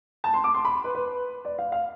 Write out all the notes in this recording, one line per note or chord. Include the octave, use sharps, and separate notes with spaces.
A5
C6
D6
C6
B5
B4
B4
D5
F5
F5